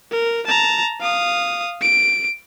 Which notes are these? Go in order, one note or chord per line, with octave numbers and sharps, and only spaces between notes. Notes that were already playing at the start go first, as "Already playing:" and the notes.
A#4
A5 A#5
F5 D#6
D7